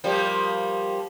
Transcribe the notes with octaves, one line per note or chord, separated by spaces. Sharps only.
F3 G3 A#3